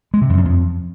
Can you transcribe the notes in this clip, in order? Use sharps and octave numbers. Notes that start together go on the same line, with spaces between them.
G#3
C3
F2
F#2
F2